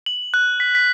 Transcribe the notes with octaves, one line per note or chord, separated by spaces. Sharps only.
F#7
F#6
B6
B6